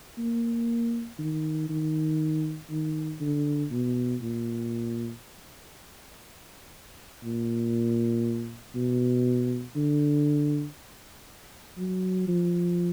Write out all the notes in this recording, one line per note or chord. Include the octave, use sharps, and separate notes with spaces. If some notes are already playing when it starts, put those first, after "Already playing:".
A#3
D#3
D#3
D#3
D3
B2
A#2
A#2
B2
D3
F#3
F3